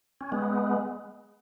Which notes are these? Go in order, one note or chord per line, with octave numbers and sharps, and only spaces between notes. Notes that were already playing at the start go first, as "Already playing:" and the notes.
C#4
G#3 B3